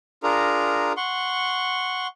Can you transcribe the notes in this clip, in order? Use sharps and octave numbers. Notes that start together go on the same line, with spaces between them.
D4 F4 G#4 A#4 A#5
F#5 C6 C#6